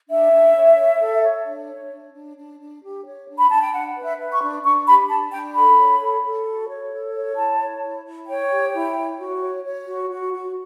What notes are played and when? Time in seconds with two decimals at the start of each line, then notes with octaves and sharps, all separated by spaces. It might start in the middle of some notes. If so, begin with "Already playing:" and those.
0.10 D4 E5
0.33 D4
0.56 C#5
0.78 C#5
1.01 A4
1.24 C#5
1.47 D4
1.69 C#5
1.92 D4
2.14 D4
2.37 D4
2.60 D4
2.83 G4
3.06 C#5
3.28 D4
3.38 B5
3.50 D4 A5
3.61 G5
3.73 D4 F#5
3.97 B4
4.04 E5
4.18 B4
4.33 C#6
4.41 D4
4.64 D4 C#6
4.88 G4 B5
5.09 D4 A5
5.33 D4 G5
5.55 A4 B5
5.77 C#5
6.01 A4
6.23 A4
6.46 F#4
6.68 C#5
6.92 A4
7.14 C#5
7.36 E4 A5
7.59 C#5
7.83 E4
8.05 E4
8.27 C#5 G5
8.50 G4
8.73 E4
8.96 C#5
9.19 F#4
9.40 C#5
9.64 C#5
9.86 F#4
10.09 F#4
10.32 F#4